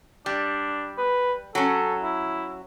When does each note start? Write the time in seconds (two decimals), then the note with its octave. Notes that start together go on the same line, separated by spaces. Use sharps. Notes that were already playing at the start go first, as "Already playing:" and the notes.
0.26 G3 D4
0.98 B4
1.55 F#3 C#4 A4
2.01 E4